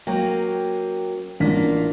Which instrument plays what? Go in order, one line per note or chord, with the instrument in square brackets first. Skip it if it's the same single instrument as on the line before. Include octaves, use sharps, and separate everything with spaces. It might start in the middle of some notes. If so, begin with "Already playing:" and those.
[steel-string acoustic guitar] F#3 A#3 C#4 [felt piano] G5
[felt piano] A1 D4 B6 [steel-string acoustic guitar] A#3 F4